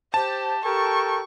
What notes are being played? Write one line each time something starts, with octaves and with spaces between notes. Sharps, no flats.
G4 C5 A5
G4 A4 A#4 G5 C#6